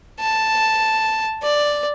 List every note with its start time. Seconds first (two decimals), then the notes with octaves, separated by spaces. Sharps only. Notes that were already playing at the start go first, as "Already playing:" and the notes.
0.20 A5
1.43 D5